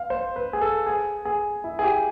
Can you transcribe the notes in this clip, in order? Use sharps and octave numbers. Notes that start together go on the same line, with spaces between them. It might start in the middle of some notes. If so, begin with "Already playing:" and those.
Already playing: F5
C5
B4
G#4
A4
G#4
G#4
E4
G#4
G4